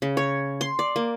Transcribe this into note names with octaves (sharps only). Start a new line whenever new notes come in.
C#3
C#5
C6
D5
A#3